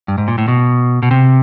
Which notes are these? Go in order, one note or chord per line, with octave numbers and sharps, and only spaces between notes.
G2
G#2
A#2
A2
B2
B2
C3